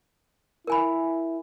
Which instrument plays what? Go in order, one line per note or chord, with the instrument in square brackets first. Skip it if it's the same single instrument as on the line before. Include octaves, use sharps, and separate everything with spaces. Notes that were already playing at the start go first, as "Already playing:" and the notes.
[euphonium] E4 [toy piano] A#4 G#5 B5